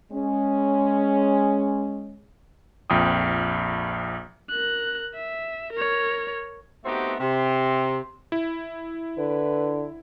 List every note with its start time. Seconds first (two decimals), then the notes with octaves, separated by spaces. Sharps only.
0.12 G#3 C#4
2.90 A#1 F2 G5 D#6
4.50 A#4 F#6
5.15 E5
5.73 A#4 C#5
6.85 A3 B3 C4 D#4 F#4 G4
7.20 C3 C6
8.32 E4
9.18 D3 B4